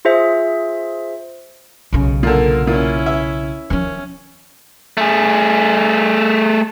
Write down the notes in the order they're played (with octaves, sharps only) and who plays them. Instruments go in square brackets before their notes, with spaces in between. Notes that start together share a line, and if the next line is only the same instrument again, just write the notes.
[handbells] F4 G#4 C5 E5
[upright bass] B1 C#3
[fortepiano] A#2 D3 [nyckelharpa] A#4
[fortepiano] A#2 [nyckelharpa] C#4 E4
[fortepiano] E5
[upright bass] D#3 F3 [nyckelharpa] C#4
[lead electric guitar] A3 G#4